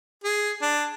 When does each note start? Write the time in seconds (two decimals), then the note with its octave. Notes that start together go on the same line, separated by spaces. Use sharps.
0.24 G#4
0.62 D4